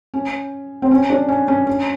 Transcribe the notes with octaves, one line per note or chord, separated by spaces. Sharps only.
C#4
C4
C#4
D4
C#4
C#4
C#4